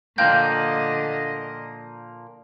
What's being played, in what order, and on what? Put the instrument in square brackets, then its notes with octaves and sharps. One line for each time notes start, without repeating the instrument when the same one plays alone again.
[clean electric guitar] A#2 F3 A#3 [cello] D3 D#5 [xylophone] F5 G5 G6